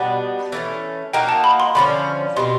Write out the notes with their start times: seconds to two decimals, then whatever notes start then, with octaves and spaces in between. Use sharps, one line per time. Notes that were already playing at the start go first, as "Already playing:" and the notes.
Already playing: B2 G3 B3 D4 F#5
0.52 E3 A3 C#4
1.13 A#3 D#4 F#4 G5
1.29 A5
1.44 B5
1.60 C6
1.75 D3 F3 A3 C#4 B5
2.37 B2 G3 C4 F4 C6